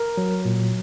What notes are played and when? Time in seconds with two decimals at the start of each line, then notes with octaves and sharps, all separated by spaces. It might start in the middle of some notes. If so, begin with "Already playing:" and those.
Already playing: A#4
0.17 F#3
0.45 A#2